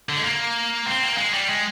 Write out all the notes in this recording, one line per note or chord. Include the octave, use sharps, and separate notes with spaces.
D3
G#3
A#3
C4
A#3
G#3
G3
G#3